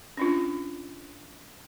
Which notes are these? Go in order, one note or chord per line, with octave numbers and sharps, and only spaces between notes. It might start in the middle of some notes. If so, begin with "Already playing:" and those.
C#4 D4 F4